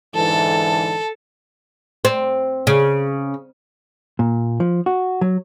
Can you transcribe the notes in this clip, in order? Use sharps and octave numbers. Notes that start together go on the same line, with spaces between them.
G#2 D3 E3 A4 A5
C4
C#3
A#2
F3
F#4
F#3